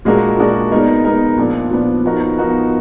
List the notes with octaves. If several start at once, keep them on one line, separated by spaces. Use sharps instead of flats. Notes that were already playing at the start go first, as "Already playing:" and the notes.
A#2 G#3 D4 F#4 A#4
A#2 G#3 D4 F#4 A#4
G#3 B3 D#4 A#4
G#3 B3 D#4 A#4
A#2 F3 B3 D4
A#2 F3 B3 D4
F3 B3 D#4 F#4 A#4
F3 B3 D#4 F#4 A#4